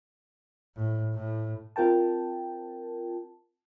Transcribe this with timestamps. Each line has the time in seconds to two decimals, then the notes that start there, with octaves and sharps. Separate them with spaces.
0.76 A2
1.14 A2
1.76 C4 F4 A#4 G5 A5